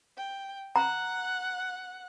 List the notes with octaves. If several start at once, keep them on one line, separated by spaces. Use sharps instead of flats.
G5
F#5 A#5 F#6